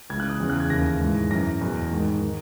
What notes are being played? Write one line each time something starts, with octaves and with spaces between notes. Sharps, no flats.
C#2 C#3 E3 G#6
F#6
D#6
E2 C#3 E3
F#6
G#6
D#2 C#3 E3 A#6
G#2 E3
F#2 E3 A#6
E2 B2
G#2 D#3
D#3